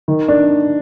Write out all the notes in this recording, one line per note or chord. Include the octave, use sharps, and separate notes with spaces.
D#3
D4